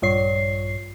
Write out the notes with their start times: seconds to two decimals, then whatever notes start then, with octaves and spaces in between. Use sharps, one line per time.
0.02 A#1 G2 C#5 C7